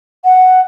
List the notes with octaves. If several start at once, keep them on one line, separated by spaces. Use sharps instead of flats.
F#5